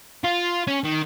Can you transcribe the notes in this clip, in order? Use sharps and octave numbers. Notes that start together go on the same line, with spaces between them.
F4
C#4
D#3